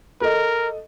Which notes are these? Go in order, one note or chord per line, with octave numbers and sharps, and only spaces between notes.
A4 A#4 D#5